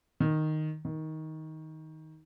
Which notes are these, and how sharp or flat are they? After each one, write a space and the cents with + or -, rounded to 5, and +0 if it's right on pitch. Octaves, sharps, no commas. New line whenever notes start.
D#3 -5
D#3 +15